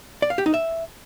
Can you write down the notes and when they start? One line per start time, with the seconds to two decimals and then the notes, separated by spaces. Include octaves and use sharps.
0.22 D5
0.30 F5
0.38 G4
0.46 D#4
0.54 E5